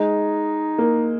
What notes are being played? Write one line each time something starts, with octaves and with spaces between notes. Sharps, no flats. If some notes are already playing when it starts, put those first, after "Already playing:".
Already playing: G#3 D#4
A#3